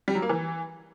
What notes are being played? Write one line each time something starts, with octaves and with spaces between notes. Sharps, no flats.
G3
F#3
A#3
E3